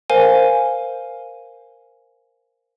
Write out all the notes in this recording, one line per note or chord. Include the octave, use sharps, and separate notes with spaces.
A#4 C5 F5 G#5